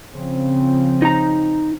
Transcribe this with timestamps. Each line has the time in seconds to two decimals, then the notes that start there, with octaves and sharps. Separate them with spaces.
0.13 C#3 F3 C4
1.02 D#4 A#5